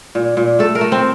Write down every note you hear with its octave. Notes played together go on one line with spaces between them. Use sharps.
A#2
A#2
A3 A4
A#4
A3
C4